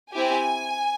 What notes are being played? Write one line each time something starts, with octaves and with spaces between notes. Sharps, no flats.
C4 E4 G4 G#5